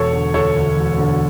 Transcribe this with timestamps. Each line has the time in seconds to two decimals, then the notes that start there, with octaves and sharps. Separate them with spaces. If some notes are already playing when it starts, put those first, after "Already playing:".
Already playing: E1 A4 C#5
0.13 D3
0.34 D2 A4 C#5
0.56 D2
0.77 E1
0.98 D3